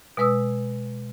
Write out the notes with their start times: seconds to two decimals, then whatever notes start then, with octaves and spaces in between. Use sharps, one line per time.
0.17 B2 G#3 B4 D#6 E6